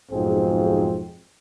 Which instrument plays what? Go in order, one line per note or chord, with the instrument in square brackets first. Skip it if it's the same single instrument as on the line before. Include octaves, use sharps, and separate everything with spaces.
[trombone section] B1 F2 G#2 C4 G#4